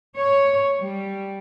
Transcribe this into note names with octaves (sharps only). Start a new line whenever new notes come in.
C#5
G3